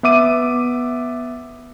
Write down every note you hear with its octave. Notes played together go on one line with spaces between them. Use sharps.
B3 E5 D6 D#7